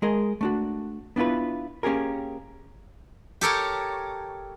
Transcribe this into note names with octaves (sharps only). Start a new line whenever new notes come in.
G#3 G#4 A#4 D#5
A3 D4 F#4
B3 D4 E4 F4 B4
A#3 C#4 G4 G#4 A#4
G4 A4 A#4 C#5